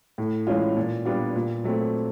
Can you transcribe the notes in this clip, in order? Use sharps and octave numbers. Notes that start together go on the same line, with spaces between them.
A2
E3 G#3 C#4 F4
A#2
G3 B3 D4 F4
A#2
F#3 A3 C4